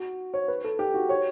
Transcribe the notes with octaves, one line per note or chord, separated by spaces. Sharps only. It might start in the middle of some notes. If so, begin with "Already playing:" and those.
Already playing: F#4
C#5
B4
A4
G4
F#4
C#5